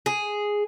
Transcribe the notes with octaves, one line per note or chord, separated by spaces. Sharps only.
G#4